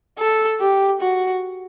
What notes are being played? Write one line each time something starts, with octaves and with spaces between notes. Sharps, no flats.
A4
G4
F#4